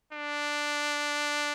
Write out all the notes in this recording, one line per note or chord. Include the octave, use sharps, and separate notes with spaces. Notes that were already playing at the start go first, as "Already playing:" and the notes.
D4